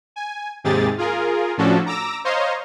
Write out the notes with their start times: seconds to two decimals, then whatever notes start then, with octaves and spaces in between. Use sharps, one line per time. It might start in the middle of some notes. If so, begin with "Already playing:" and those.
0.16 G#5
0.64 D#2 G#2 C3 G4 G#4 A6
0.98 F4 G#4 A#4
1.57 A2 F3 C#4 D4 F#4 A4
1.86 A#5 D6 E6 A#6
2.25 C5 C#5 D#5 F5 A#5 C6